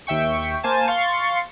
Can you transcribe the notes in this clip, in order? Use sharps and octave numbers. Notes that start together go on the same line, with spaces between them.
D#2 E5 G5 C#6
A#3 C5 G#5 A5
F5 C6 C#6 A6 C7 C#7